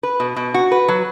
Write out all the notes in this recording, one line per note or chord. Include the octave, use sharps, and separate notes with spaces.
B4
B2
B2
F#4
B4
F#3